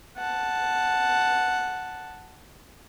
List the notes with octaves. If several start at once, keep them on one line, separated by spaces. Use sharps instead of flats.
F#5 A5